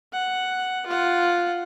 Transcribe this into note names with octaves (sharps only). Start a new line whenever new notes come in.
F#5
F4 F#5